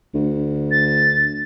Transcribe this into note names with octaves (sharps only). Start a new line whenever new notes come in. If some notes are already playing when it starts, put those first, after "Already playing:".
D2
A6